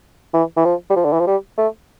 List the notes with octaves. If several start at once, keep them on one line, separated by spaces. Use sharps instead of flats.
E3
E3
F3
G3
F3
D3
E3
F3
G3
A3